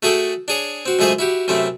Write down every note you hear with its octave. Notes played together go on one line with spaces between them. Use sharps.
A3 F#4 G#4 A4 G5
D4 G#4 C#5
C4 F#4
C#2 F#2 A3 G#4 C5 G#5
E4 F#4 G4
F#2 C3 A3 C4 E4